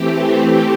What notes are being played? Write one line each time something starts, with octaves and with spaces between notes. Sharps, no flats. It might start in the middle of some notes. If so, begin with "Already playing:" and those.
Already playing: E3 A3 C4 G4